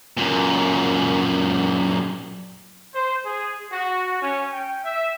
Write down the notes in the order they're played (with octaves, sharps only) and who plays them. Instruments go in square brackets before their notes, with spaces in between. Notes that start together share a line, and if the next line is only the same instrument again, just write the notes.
[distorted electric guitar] F#2 A#2
[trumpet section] C5
G#4
F#4
C#4
G5
E5